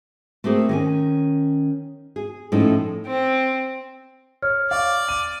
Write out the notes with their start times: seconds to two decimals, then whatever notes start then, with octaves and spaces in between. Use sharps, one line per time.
0.44 A3 A#3 C4 G#4
0.69 D#3 C#4 G#5
2.16 G#4
2.52 A2 F3 C#4 D#4 A4
3.07 C4
4.42 C#5 F6
4.71 D5 F5 C#6
5.08 D#7